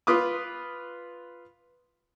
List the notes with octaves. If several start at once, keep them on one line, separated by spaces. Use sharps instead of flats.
F4 B4 D6 D#6